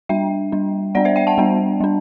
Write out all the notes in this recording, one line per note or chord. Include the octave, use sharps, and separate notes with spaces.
G3 D4 E5 G5
G3 D4
G3 B3 D4 D5 F#5
C5 E5
E5 G5
F#5 A5
G3 B3 D4
G3 D4